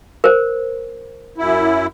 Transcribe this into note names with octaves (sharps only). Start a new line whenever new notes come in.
A#4 C5
F#2 E4